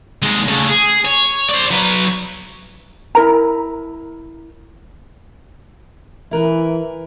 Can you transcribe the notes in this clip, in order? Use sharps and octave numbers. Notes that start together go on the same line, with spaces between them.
D#2 G#3
C#3 A3
G#4
C#5
C5 D5
F#3 B4
E4 A#4 A#5
E3 E4 A#4 B4